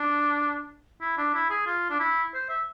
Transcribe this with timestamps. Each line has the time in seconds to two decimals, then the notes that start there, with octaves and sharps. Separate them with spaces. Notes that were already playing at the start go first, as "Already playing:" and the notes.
Already playing: D4
1.01 E4
1.17 D4
1.34 E4
1.50 G#4
1.66 F4
1.90 D4
2.00 E4
2.34 C5
2.49 E5